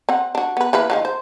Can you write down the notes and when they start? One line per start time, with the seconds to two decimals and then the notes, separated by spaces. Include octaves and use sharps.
0.09 C4 F#5
0.35 D4 F#4
0.57 B3 B4
0.73 E3 A#3 B4
0.90 D#3 F3 F#3
1.05 C5